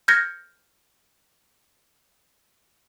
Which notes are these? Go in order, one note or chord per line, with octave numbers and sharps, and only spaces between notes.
F6 G6 G#6 A#6 C#7